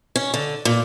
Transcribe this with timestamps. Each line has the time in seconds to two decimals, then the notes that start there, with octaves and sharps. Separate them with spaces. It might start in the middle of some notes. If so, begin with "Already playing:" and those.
0.16 C#4
0.34 D3
0.65 A#2